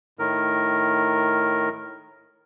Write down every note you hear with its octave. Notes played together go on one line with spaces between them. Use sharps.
A2 D#3 A#4